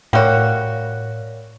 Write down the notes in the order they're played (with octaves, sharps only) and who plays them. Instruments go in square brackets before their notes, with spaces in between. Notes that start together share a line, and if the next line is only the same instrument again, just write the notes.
[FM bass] A2 [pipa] G3 F#4 [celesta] A#4 C#5 F5